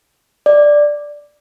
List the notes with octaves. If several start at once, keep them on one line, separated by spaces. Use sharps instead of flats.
D5